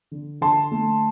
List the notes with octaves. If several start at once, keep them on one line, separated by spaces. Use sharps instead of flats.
D3
D3 A5 C6
A3